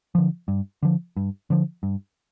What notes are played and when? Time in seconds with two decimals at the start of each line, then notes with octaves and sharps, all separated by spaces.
0.15 D3 F3
0.48 G2
0.83 D3 F3
1.16 G2
1.50 D3 F3
1.83 G2